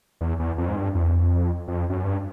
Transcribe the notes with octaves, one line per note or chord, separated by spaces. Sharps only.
E2
E2
F2
G#2
G2
F2
E2
F2
F2
F#2
G2